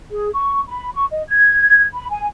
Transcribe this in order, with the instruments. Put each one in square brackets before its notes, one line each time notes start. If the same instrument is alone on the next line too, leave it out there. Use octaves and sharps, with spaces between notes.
[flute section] G#4
C#6
B5
C#6
D#5
G#6
B5
G#5